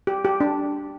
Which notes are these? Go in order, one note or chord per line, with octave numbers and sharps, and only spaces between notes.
G4
G4
D4